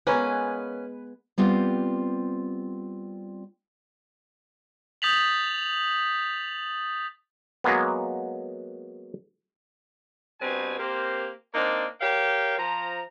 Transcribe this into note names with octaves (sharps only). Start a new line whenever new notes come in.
G#3 A#3 B3 C#4 G#4 B4
G3 B3 C4 F4 G4
D#6 G6 A6 B6 F7 F#7
F#3 G#3 A#3 B3
G2 B2 C4 B4 G#5
A#3 C4 G4 A#4 C5
A#3 C4 D4 D#4 D5
G4 A#4 C#5 F5 G5
F3 A#5